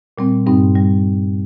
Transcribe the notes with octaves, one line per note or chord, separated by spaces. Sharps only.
A#2 G3 C4
G2 G3 C4 D#4
G3